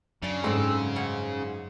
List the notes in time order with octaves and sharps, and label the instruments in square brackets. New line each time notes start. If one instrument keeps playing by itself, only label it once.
[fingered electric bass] F#2 [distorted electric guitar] C#3 [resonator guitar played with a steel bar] D4 D5
[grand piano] G#2 [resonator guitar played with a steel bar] C4 A4
[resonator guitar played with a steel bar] G3 C#5 F#5